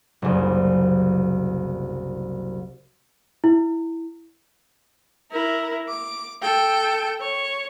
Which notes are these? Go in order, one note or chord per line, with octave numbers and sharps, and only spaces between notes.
F#1 C2
E4
E4 A#4
D6
A4 G5
C#5